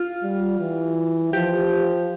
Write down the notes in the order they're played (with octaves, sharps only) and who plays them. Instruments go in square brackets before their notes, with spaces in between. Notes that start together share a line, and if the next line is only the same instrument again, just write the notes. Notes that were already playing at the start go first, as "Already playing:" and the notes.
Already playing: [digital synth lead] F4
[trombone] G3
E3
[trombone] F3 [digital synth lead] G4